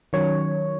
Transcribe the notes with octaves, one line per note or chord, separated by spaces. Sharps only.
D#3 F#3 C#4 C#5